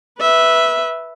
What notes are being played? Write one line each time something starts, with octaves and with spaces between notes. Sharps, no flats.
B4 E5